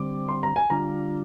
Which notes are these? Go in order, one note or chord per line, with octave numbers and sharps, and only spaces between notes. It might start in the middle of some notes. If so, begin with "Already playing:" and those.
Already playing: D3 G3 C4 D6
C6
A#5
G#5
D3 G3 D4 F4 A#5